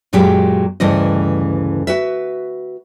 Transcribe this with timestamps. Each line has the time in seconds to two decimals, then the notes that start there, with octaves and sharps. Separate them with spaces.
0.13 F#2 A#2 F#3 G#3 G4
0.80 D2 G2 C#3 E3 A3 D#5
1.87 F#4 B4 E5